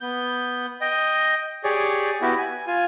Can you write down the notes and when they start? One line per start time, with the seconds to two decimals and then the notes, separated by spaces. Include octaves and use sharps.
0.01 B3 G6
0.81 D#5 G5
1.64 G4 G#4 C#5 D5
2.22 B3 E4 F#4 G4
2.38 G#5
2.67 F4 G#5